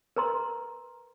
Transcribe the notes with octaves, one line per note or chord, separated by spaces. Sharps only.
A#4 B4 A#5 C6